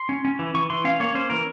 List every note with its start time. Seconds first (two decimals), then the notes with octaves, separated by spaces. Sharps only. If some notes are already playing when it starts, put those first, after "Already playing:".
Already playing: C6
0.09 C#4
0.25 C#4
0.39 E3
0.54 E3 C#6
0.70 E3 C6
0.85 C#4 F5
1.00 A#3 C#5
1.15 C#4 C5
1.30 E3 A#4